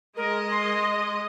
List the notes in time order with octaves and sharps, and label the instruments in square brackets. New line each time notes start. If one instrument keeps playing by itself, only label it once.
[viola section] G#3 D#5 [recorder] A#4
[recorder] C6